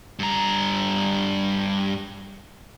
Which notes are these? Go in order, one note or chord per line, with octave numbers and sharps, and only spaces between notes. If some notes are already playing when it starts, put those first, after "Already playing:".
G2 A#5